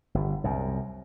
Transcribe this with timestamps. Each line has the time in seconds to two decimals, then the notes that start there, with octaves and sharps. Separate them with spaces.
0.15 G1
0.44 C2 F#2